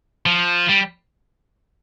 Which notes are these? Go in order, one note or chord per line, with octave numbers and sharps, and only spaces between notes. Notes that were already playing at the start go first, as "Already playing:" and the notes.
F3
G3